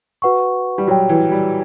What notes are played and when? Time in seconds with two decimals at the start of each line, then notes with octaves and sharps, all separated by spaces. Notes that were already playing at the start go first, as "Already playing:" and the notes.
0.22 F#4 B4 F#5 C#6
0.78 G3
0.87 F#3 F#4 C#5 G5
1.09 E3
1.32 G3